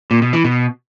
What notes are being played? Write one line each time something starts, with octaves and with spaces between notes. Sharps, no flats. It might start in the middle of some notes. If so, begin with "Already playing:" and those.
A#2
B2
E3
B2